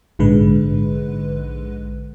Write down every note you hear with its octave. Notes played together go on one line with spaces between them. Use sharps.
A#1 G#2 D3 G#3 B4